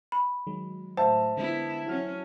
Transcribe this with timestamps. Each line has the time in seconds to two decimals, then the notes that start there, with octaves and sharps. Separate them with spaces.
0.12 B5
0.47 D#3 F#3 G#3
0.97 A2 C5 E5 A5
1.37 D3 G#3 B3 E4
1.87 F#3 C#4 E4 F#4 F6